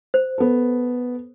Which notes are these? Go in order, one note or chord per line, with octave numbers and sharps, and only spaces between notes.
C5
B3 A4